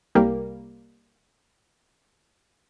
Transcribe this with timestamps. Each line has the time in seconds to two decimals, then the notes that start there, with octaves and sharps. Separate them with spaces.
0.15 C2 G3 A#3